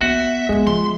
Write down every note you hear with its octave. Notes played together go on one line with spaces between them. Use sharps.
B3 F#4 E5
G#3 B3 D#4
F3 C6